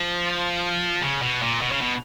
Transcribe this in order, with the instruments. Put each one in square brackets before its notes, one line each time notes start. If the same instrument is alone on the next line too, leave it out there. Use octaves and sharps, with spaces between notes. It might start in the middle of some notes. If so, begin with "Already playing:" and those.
Already playing: [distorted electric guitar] F3
C#3
B2
A#2
B2
C#3
B2